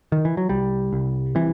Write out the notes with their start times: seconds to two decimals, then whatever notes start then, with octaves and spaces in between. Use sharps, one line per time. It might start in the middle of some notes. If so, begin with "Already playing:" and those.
0.12 D#3
0.25 E3
0.37 F#3
0.49 C2 G3
0.93 C2
1.35 C3 E3